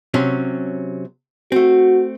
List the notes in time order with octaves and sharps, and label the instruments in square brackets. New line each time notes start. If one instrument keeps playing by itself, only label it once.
[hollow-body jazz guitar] C3 F#3 C#4
[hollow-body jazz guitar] A3 C4 [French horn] F#4